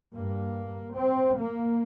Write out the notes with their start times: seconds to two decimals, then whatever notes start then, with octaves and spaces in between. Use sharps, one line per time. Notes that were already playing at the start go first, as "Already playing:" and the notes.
0.13 G2 A#3
0.94 C4
1.36 A#3